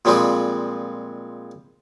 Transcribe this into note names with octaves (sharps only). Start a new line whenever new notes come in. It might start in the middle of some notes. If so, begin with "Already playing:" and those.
A#2 F3 G3 G#3 C4